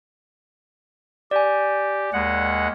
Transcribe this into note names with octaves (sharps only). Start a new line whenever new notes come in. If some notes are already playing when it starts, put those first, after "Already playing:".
G4 D5 G#5
D#2 G#3 F#5